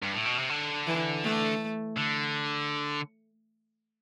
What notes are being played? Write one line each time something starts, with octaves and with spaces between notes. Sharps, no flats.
G2
A2
B2
C3
D3
E3
A3
D3